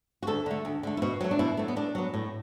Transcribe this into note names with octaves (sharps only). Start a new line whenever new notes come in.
F#4
D2 A4
D3 A3
D2
D3 A3
E4
B2 F#4
F#3 A3
D4
B2 E4
F#3 A3
B3
A2 D4
F#3 B3
A2